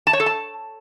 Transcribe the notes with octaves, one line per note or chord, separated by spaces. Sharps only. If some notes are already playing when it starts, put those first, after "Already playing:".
A5
C#5
A4
A5